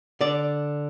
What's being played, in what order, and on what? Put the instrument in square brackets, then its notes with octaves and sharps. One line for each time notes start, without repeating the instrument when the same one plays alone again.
[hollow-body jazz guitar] D3 D5